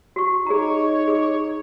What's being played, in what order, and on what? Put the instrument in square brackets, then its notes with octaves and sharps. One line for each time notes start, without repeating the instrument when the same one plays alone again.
[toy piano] F#4 C#6
[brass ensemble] D#4 C#5 [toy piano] G#4 A#5
[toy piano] G#4 D6